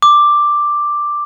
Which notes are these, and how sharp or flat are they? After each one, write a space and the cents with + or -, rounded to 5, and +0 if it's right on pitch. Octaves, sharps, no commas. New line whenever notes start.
D6 +5